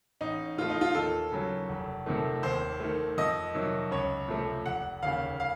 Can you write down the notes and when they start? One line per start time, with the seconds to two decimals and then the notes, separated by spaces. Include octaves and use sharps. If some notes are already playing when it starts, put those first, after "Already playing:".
0.21 A1 D#4
0.57 A2 F3 A3 F4
0.70 D#4
0.81 F4
0.95 D#2 A4
1.32 C#3 F#3
1.69 F1
2.06 F2 C3 D#3 A3
2.43 D#2 C5
2.80 D#3 A3
3.17 F2 D#5
3.55 C3 D#3 F#3
3.91 C#2 C#5
4.28 C3 F3 A3
4.66 F1 F#5
5.02 D#2 C#3 F5
5.40 F5